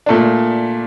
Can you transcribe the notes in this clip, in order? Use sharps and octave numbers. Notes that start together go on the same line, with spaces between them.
A#2 A3 D4